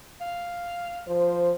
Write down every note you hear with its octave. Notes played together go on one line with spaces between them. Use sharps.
F5
F3 C5